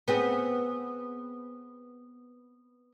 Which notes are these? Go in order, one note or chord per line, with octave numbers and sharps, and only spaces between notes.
B3 C4 G#4